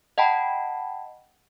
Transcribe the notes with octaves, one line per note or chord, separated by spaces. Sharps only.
D#5 F#5 G5 A5 B5